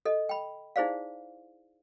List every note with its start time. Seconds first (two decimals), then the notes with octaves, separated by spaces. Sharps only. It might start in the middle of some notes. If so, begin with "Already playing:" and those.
0.06 A4 D#5
0.29 G5 B5
0.76 D#4 E4 G#4 C5 D5 F5